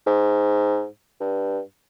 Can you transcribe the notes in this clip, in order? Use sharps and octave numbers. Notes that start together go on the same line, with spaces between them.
G#2
G2